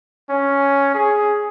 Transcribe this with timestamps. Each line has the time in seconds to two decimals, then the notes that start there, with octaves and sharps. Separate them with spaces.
0.29 C#4
0.95 G#4